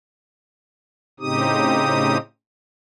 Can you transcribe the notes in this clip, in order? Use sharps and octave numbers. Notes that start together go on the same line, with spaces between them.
A2 C#3 C4 D#4 G4 D#6